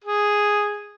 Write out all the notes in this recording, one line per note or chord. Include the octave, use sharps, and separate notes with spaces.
G#4